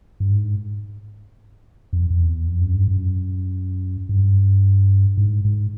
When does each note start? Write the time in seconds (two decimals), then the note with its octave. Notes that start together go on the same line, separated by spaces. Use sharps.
0.20 G2
0.31 G#2
1.93 F2
2.10 F2
2.20 E2
2.47 F2
2.61 F#2
2.74 G2
2.88 F#2
4.09 G2
5.17 G#2
5.45 G#2